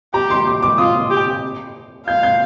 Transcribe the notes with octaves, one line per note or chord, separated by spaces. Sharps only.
G4 A#5
C6
D6
D6
F4 D#6
G4
F5 G6
G6